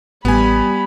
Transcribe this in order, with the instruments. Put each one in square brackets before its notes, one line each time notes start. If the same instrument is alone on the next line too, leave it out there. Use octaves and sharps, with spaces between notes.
[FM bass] A1 [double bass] G3 [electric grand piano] B3 G#5 [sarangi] B5